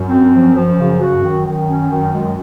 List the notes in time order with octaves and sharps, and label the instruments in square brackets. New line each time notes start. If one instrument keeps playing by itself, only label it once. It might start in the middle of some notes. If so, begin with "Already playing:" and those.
Already playing: [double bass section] F#2
[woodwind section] C4
F3
F3
C#3
F#4
[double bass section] F#2 [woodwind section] D#3
[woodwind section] D#3
C#4
D#3
G#3